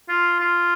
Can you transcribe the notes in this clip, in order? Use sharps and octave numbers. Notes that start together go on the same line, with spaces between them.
F4
F4